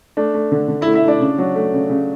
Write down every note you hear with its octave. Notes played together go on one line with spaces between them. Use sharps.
A3 D4
A3
D3
D3
E4 E5
A3
E4 E5
A3 D4 D5
C#3
F#3
A3
C#3
C#3